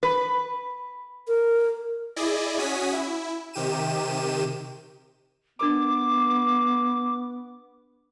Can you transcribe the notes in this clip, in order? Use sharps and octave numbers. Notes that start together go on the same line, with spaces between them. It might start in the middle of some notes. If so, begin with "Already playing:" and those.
B4
A#4
E4 G#4 D5 D#5
C#4 F#4 G#5 D#6 B6
E4
C3 D#3 G4 D#7 E7
B3 D4 A#4 B5 D6